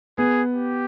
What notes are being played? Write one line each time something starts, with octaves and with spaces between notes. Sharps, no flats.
B3 G#4
G4